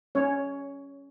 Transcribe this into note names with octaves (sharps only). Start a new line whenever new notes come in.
C#4 C#5